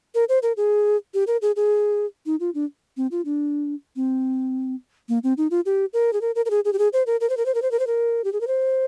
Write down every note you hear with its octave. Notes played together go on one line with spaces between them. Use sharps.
A#4
C5
A#4
G#4
G4
A#4
G#4
G#4
D#4
F4
D4
C4
F4
D4
C4
A#3
C4
D#4
F4
G4
A#4
G#4
A#4
A#4
A#4
G#4
G#4
G4
G#4
C5
A#4
A#4
C5
A#4
C5
A#4
C5
A#4
C5
A#4
G4
G#4
A#4
C5